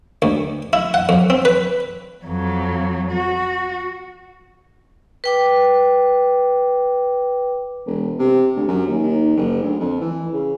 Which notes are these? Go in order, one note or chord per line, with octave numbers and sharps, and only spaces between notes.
D2
E4
F#5
F2
C4
B4
F2 F#3
F#4
B4 G5 D6
E1
C3
D2
F#2
D#2
D#2
F#1
D2
F2
E3
C#3